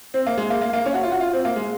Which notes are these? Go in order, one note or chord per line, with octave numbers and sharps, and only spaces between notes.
C4
A#3
G#3
A#3
A#3
A#3
C#4
F#4
F4
F#4
F4
C4
A#3
G#3